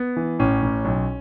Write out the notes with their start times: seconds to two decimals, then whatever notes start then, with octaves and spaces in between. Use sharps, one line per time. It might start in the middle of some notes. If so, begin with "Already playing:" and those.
Already playing: B3
0.16 E3
0.39 A1 C#4
0.62 A1
0.85 B1